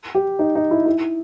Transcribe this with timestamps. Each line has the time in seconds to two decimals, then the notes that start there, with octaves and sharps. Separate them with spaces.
0.15 G4
0.39 D#4
0.55 D#4
0.71 E4
0.86 E4